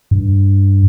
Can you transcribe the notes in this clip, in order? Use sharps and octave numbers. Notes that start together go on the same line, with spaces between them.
G2